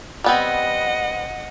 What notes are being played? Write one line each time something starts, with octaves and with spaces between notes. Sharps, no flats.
G3 B3 C4 D#5 F#5